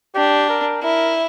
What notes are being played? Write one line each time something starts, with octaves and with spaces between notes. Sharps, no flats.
D4 G4
A#4
E4 A#4